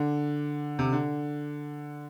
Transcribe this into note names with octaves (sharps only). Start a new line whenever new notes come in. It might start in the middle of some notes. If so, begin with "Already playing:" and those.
Already playing: D3
C3
D3